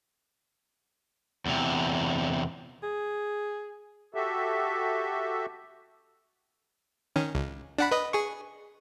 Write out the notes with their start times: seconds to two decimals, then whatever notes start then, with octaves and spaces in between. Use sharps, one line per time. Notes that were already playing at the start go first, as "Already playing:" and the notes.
1.46 E2 C3
2.83 G#4
4.14 F#4 G4 A4 E5
7.16 D#3 C#4
7.35 C#2
7.78 D4 F#5 B5
7.91 B4 D#5
8.13 G#4 C#6